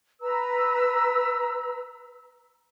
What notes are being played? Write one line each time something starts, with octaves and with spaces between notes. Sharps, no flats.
B4 A#5 E6